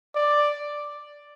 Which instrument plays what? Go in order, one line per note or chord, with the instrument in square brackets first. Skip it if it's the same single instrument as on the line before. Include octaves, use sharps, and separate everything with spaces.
[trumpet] D5